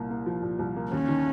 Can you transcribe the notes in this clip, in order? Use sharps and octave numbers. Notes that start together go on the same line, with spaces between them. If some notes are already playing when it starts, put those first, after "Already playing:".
Already playing: C2 A#2 A#3
A#3
F3
A#2
C2
A#3
D#2 C#4
D#3